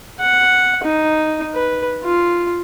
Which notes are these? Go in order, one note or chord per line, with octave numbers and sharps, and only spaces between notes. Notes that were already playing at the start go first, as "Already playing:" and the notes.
F#5
D#4
B4
F4